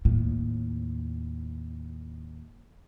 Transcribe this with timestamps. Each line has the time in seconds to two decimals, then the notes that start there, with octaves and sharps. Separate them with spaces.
0.05 D#2 A2